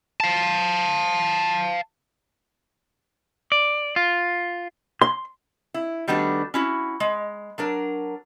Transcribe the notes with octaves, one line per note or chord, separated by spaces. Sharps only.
F5 A5
D5
F4
C6
E4
D#3 G3 A3 B3 D4 F#4
C#4 E4 F#4
G#3
F#3 D4 A#4